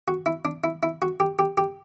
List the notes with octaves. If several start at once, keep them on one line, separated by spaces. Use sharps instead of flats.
F#4
E4
D4
E4
E4
F#4
G4
G4
G4